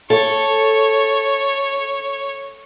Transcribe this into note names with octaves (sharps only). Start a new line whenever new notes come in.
A4 C#5